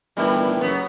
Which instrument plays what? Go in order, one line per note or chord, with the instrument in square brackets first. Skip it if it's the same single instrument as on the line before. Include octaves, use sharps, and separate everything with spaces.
[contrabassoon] G1 [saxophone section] A2 D#3 E3 [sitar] G3
[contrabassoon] F#1 [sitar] F#3 B3